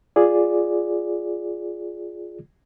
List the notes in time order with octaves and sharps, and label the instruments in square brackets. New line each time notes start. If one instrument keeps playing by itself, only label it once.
[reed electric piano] F4 G#4 D5